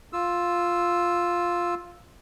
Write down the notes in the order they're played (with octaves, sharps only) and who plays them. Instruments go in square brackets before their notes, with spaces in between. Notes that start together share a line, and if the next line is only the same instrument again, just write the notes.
[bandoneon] F4 E6